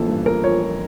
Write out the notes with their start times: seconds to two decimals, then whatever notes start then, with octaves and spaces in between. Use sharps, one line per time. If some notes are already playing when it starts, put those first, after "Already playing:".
Already playing: A1 F3 A#3 A4
0.08 G2
0.26 F3 A#4
0.44 F3 C#5
0.62 F3